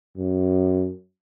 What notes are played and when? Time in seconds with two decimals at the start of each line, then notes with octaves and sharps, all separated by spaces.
0.17 F#2